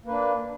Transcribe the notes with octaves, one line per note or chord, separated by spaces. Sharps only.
A#3 D4 B4